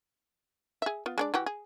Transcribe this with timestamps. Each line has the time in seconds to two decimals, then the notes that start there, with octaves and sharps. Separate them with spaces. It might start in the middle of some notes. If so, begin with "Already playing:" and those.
0.82 G#4 E5
1.06 B3 F4
1.18 G#3 D4 D5
1.34 E3 F#4 G4
1.46 G#4